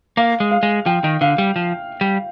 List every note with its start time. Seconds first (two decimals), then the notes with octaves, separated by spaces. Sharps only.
0.17 A#3 F5
0.40 G#3
0.51 F5
0.63 G#3
0.86 F3 G5
1.04 D#3
1.21 D3 F5
1.38 G3
1.56 F3
2.01 G3